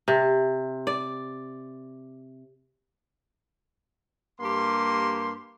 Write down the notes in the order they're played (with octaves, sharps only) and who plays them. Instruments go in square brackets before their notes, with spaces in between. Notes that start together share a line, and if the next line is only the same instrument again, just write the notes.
[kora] C3
D5
[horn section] G2 A#3 G4 C6